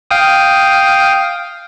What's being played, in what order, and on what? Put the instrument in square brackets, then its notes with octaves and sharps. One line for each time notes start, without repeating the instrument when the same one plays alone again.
[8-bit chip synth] F5 G5 D#6